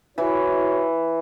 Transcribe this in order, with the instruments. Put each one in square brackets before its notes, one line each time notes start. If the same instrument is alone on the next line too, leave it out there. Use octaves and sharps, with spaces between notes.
[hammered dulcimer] E3 [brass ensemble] E4 F#4 C#5